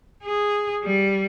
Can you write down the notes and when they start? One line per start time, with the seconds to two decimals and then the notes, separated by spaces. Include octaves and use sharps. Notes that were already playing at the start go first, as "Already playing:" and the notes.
0.23 G#4
0.84 G3